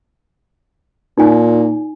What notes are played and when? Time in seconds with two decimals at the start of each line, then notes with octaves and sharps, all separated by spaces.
1.18 A#2 D#4 G#5